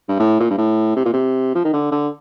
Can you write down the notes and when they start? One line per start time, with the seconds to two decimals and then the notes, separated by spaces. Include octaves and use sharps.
0.09 G2
0.19 A2
0.40 A#2
0.51 G2
0.58 A2
0.96 C3
1.06 A#2
1.13 C3
1.55 F3
1.64 D#3
1.73 D3
1.91 D3